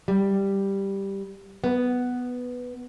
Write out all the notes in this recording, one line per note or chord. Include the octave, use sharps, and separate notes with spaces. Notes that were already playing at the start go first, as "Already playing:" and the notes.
G3
B3